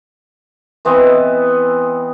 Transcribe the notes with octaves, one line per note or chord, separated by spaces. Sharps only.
E3 B3 C4 D#5